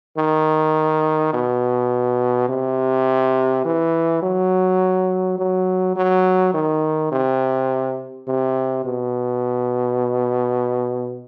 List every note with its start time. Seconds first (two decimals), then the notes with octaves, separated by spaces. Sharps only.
0.18 D#3
1.33 B2
2.49 C3
3.65 E3
4.23 F#3
5.38 F#3
5.96 F#3
6.54 D#3
7.12 C3
8.28 C3
8.85 B2